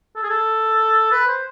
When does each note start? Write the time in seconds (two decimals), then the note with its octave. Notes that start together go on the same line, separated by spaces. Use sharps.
0.16 A4
0.23 G#4
0.30 A4
1.12 B4
1.28 C5